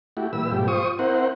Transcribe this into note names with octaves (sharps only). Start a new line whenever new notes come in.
A3 E4 F#4 G4
A#2 E3 G3 B4 E6
G#2 B2 F3 G3 A3 G4
F4 C5 C#6 D#6
C4 E4 A#4 C5 F#5